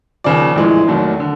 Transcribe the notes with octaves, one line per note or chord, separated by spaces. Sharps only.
D#2 C#3 F3 D5
A#1 A2 E3 G#3
F1 D#2 D#3 F#3 A3
D3